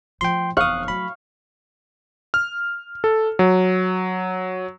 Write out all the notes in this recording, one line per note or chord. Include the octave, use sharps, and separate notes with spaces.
F3 A3 G5 C6
F1 E2 F5 C#6 D#6 F#6
F#3 A3 B5
F6
A4
F#3